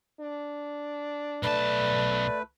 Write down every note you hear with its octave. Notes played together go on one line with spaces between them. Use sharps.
D4
B1 A3 B4 D5 A5